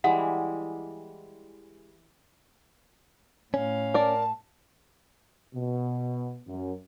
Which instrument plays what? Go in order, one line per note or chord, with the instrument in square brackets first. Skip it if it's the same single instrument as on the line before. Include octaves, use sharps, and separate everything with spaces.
[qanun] E3 G3 G#3 [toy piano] F#5
[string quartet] A2 F5 [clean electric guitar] C#4
[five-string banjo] A#4 D5 [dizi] A5
[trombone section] B2
F#2